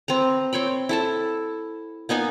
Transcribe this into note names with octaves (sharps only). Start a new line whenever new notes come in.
C4 B4 A#5
C4 C#5 G5 B5
E4 A4 A5
A#3 B3 D#4 G#5